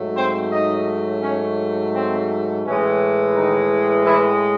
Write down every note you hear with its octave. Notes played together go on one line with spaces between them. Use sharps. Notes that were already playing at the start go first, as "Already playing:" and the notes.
Already playing: G#2 F#3 A3
C4 C5
D#4 D#5
C#4 C#5
C4
A2 E3 G#3 C#4
D#3 D#4
E3 E4